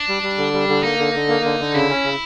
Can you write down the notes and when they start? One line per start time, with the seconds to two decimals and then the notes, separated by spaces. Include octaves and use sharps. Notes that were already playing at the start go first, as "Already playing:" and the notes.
Already playing: D4
0.09 G3
0.23 G3
0.38 D3
0.53 G3
0.69 D3
0.83 A#3 D#4
0.99 D3
1.14 D3
1.29 A#3
1.45 D3
1.60 D3
1.74 C#3 E4
1.90 C#4
2.04 C#3